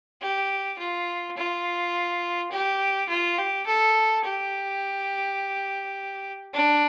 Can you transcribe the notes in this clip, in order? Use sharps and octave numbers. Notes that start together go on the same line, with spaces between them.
G4
F4
F4
G4
F4
G4
A4
G4
D4